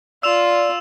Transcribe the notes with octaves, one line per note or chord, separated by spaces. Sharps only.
F4 D5 E6 E7 F7